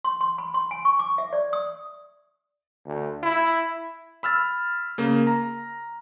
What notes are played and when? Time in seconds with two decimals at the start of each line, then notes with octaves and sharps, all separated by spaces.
0.05 C6
0.21 C6
0.38 B5
0.54 C6
0.71 G#5
0.85 C#6
0.99 D6
1.18 E5
1.33 D5
1.53 D#6
2.86 D2
3.23 E4
4.23 B5 E6 F6 A6
4.98 C#3 A#3
5.27 A#5